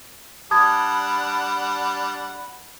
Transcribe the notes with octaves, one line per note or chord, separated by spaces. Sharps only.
G3 D4 F#5 A5 B5 D#6 G#6